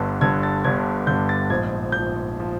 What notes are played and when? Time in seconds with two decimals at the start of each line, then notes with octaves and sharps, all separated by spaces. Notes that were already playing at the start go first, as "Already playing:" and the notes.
Already playing: G1 G2 D3
0.21 G1 G2 D3 G#6
0.43 A6
0.64 G1 G2 D3 G#6
1.07 G1 G2 D3 G6
1.29 A6
1.50 A#1 G#2 F3 G#6
1.92 A#1 G#2 F3 G6
2.40 F3